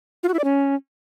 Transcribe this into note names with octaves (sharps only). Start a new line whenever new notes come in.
F4
F#4
E4
D5
C#4